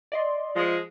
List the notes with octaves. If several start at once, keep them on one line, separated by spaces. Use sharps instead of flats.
D5 D#5 C6
F3 G#3